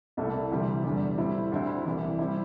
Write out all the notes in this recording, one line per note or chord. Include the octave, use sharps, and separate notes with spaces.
C2 C3 A3 E4
D2 C3 E3 G3
E2 D3 G3
A2 G3 C4 E4
D2 D3 C4 E4
C2 C3 E3
G3 C4 E4